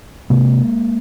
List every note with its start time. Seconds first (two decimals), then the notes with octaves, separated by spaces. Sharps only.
0.30 C3 G#3 A#3